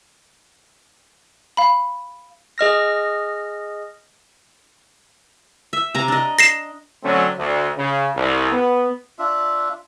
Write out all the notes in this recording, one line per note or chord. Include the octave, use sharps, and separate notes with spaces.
F5 B5
G#4 D#5 F6 A#6
E5
C3 A#5
D4 D#5
A#6 C7 E7
D3 F#3 A3 C4 C#4
D2
C#3
C2
B3
D4 F4 E5